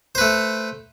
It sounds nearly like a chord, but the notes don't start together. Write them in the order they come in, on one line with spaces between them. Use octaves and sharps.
C5 B4 A3